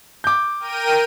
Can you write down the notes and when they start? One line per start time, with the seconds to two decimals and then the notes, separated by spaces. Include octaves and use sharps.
0.24 D6 G6
0.59 A#4 G5 D#7